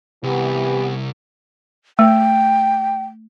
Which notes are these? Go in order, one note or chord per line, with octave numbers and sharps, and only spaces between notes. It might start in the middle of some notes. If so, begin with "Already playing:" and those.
C2 E3 B3 G4
A3 G5